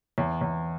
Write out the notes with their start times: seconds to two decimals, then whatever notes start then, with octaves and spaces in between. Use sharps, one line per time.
0.18 E2
0.41 E2